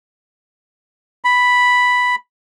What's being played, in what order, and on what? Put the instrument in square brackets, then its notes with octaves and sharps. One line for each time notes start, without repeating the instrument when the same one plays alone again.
[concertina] B5